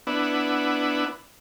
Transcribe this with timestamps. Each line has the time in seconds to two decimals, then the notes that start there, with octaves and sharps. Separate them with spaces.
0.07 B3 D4 E4 F#5